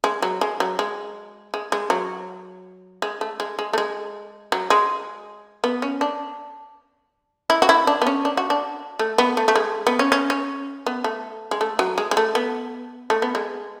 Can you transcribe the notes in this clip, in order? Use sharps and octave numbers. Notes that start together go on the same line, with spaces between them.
G#3
F#3
G#3
F#3
G#3
G#3
G#3
F#3
G#3
A3
G#3
G#3
A3
G#3
F#3
G#3
B3
C#4
D4
E4
F#4
E4
D4
B3
C#4
D4
F#4
D4
A3
B3
A3
A3
G#3
B3
C#4
C#4
C#4
B3
A3
G#3
A3
F#3
G#3
G#3
A3
B3
A3
B3
G#3